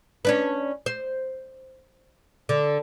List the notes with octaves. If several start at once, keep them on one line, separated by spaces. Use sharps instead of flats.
C#4 D4 B4
C5
D3